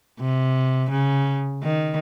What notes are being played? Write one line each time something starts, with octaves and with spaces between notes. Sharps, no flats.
C3
C#3
D#3